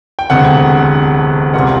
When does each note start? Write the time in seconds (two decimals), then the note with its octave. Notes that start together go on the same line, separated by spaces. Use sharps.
0.19 G5
0.30 E1 D2 C3 F#5
1.54 C2 A#2 G3 C4 F#5